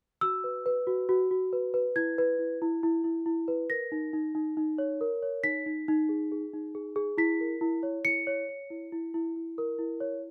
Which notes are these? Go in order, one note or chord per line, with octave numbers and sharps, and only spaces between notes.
F#4 E6
B4
B4
F#4
F#4
F#4
B4
B4
E4 G#6
B4
E4
E4
E4
E4
E4
B4
A#4 A#6
D#4
D#4
D#4
D#4
C#5
A#4
C#5
D#4 B6
D#4
D#4
G#4
G#4
D#4
G#4
G#4
E4 B6
A#4
E4
C#5
E4 C#7
C#5
C#5
E4
E4
E4
E4
A#4
E4
C#5